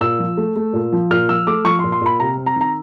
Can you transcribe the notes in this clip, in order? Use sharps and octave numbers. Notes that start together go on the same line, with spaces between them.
A#2 E6
F3
A3
A3
A#2
F3
A#2 F6
F3 E6
A3 D6
F3 C#6
C6
A#2
C6
A#2 B5
C3 A#5
C4
A#5
D#3
A#5